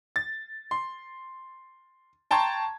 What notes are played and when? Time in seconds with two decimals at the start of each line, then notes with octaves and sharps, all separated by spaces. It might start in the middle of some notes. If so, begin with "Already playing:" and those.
0.16 A6
0.71 C6
2.31 G5 A5 A#5 C6 C#6 G#6